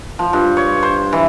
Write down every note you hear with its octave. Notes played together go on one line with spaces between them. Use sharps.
F3
G2
C#5
C5
E3